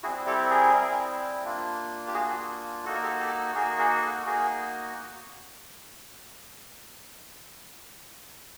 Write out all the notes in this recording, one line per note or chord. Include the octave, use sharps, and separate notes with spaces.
G3 C4 E4 F#4 G#4
G4 A4
G#4 A#4
G3 C4 E4
A#3 D4 F4
G4
A#3 D4 F4 F#4 G#4
A#3 D#4 F#4 A4
A#4
G4 A4
G4 A4
A#3 D#4 F#4 G#4 A#4
G#4 A#4
A4 B4
A#3 D#4 F#4 G#4 A#4